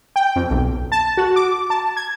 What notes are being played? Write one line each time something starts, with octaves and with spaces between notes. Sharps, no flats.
G5
F2
B1
A5
F#4
D6
A5
G#6